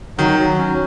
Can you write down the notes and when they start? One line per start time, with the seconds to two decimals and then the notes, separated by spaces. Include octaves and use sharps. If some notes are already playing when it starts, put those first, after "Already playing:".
0.18 D#3 F#3
0.39 F#3
0.58 C#4